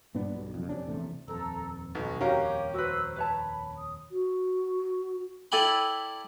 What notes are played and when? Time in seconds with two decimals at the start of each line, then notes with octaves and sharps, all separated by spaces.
0.15 G2 A#2 B3 D4
0.35 B1 G2
0.54 F#1 F2
0.69 F2 C3 C#4 D4
0.87 A#1 E2 C3 A3
1.28 D#1 F2 A4 A#5 E6
1.95 B1 F#4 D#5
2.21 C#4 F#4 G4 A#4 C#5 F5
2.74 F#4 B4 C5 E6
3.16 B4 C#5 A5 B5
3.75 D#6
4.11 F#4
5.52 E4 A4 D5 G5 G#5 B5